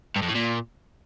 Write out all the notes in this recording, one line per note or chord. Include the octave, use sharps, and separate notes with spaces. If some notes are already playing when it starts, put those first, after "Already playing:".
G2
F2
A2
A#2